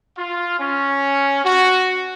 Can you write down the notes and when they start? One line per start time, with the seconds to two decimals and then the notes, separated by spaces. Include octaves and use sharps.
0.16 F4
0.59 C#4
1.44 F#4